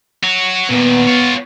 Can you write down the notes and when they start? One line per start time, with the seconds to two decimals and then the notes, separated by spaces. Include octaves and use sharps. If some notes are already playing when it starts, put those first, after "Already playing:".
0.23 F#4 C#5
0.70 A#2 D#3 B3
1.08 F4 C#5